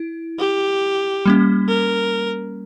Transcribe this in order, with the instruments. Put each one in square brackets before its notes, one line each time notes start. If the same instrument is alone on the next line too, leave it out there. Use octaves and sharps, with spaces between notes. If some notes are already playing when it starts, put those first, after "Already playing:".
Already playing: [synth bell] E4
[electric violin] G4
[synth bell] G3 A#3 C#4
[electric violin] A#4